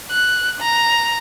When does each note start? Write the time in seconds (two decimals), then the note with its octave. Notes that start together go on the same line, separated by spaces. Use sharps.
0.11 F#6
0.60 A#5